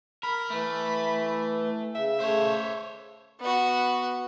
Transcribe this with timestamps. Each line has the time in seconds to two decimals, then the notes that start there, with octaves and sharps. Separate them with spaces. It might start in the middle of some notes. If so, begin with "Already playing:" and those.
0.23 A#4 B5
0.50 E3 A3
1.95 C#3 E5
2.20 C#3 A3 C5 C#5
3.40 B3 F#4